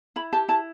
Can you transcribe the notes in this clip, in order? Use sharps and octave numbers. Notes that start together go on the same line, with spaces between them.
E4 B5
G4 A5
E4 A5